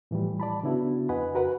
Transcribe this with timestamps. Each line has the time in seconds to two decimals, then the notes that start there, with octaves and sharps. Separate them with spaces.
0.11 A2 E3 F3 G3
0.40 D5 A5 B5
0.63 C#3 B3 D4 E4 F#4
1.09 F2 B4 D#5 F#5 G#5 B5
1.35 F#4 A#4 B4 F#5